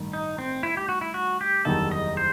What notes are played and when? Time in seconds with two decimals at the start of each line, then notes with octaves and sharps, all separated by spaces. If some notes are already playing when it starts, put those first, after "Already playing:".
Already playing: A1 G2 D#3
0.13 D#4
0.38 C4
0.63 E4
0.77 G4
0.89 F#4
1.01 E4
1.14 F#4
1.41 G4
1.65 F#1 E2 D#3 G3 D#4 A4
1.91 D#5
2.17 C5